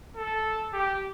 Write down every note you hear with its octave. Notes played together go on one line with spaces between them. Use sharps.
A4
G4